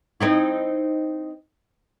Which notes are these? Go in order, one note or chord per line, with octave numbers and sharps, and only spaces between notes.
C4 D#4 E4